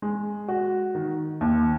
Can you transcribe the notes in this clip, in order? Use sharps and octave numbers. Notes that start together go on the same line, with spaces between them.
G#3
F#4
D#3
D#2